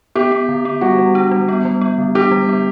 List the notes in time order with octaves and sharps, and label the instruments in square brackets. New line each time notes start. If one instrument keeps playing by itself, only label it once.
[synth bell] B3 [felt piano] G4
[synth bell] B3
D3
B3
[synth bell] G3 [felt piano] F#4
[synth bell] G3
D4
G3
B3
G3
B3
D3
[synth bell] D4 [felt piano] G4
[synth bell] G3
B3